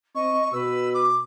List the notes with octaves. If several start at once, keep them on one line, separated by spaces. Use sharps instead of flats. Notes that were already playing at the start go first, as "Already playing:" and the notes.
C4 D#5 C#6
B2 B4 E6
D6